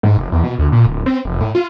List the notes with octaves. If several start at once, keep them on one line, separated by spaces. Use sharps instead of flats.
G#2
F1
E2
B2
D2
A#2
D1
C4
F1
A2
F4